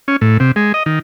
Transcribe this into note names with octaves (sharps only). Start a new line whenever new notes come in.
C#4
A2
C3
G#3
D#5
D#3